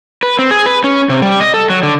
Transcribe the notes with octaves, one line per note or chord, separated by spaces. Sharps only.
B4
C4
G#4
B4
C#4
C3
G3
D#5
A4
F#3
D3